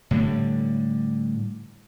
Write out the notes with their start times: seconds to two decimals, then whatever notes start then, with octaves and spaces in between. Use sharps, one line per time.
0.11 A2 D3 G3